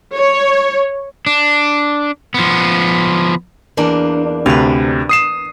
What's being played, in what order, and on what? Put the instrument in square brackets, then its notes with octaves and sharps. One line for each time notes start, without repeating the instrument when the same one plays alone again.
[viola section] C#5
[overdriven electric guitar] D4
F3 B3
[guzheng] E2 A#3 D4
[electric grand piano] D2 C3 [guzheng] B4 F5
[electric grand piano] D#6 C7 E7